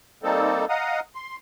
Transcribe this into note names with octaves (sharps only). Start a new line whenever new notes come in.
G3 A#3 C4 D#4 A4
D#5 F5 F#5 A#5 D#6
C6